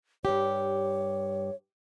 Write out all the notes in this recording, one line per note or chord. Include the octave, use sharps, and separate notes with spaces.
G2 G4 C#5